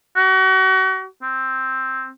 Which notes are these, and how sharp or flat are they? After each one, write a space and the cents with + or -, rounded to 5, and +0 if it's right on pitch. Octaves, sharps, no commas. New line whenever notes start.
F#4 +35
C4 +5